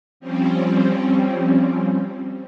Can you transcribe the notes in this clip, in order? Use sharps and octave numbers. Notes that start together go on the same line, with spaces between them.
F3 G3 C4 C#4